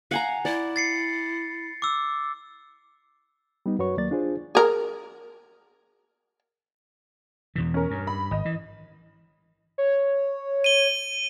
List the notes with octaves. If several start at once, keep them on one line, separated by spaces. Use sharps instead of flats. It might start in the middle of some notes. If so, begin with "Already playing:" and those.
F5 F#5 G#5 A#5
E4 D5
A6 C7 C#7
D6 E6
G3 B3 D#4
F#2 F#4 B4 C#5 C#6
D#2 F#3 A#3 D5 A6
D4 F4 G#4 C5
G#4 A#4
E2 B2 E3
C#4 A#4
G2
B5
G#1 D#5
E3
C#5
D#7 G7